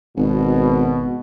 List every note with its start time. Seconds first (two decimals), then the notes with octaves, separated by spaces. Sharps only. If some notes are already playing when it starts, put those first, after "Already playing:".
0.17 G#1 B2